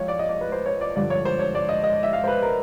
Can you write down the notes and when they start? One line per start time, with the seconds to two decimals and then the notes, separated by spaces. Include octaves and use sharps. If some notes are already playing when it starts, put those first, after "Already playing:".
Already playing: C#2 F3 C#5
0.08 D5
0.19 D#5
0.29 D5
0.41 B4
0.52 C5
0.66 C#5
0.81 D5
0.96 G2 D3 F3 D5
1.10 C#5
1.25 C5
1.39 C#5
1.55 D5
1.69 D#5
1.84 D#5
2.03 E5
2.13 F5
2.24 C5
2.27 B4
2.42 A#4